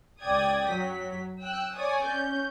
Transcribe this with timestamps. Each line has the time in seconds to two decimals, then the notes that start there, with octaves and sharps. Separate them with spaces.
0.23 C#2 D5 G5 D#6 G#6
0.70 F#2 F#3 B6
1.40 G5 E6 F#6
1.76 C#5 D5 G#5 D#6
2.05 C#4 G6